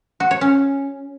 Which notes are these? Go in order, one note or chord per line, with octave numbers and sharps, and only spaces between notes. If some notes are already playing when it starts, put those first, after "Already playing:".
F#4
C#5
C#4